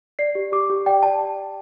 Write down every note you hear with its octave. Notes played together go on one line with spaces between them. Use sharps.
D5 C7
G4
G4 D6
G4
D5 G5
D5 A5